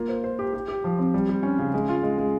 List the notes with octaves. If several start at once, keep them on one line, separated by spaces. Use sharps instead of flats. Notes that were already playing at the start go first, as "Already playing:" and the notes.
Already playing: A#3 F4
C5
C5
G4
G4
G4
F3
C4
G3
G3
C#4
C#3
G#3
F4
G#3
G#3